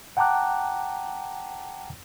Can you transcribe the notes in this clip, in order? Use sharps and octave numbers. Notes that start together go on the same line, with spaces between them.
F#5 G5 A5 A#5 D6 F#6